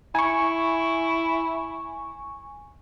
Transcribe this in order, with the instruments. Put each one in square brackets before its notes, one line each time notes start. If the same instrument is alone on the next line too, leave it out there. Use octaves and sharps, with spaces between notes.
[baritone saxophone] E4 [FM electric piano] G#5 C#6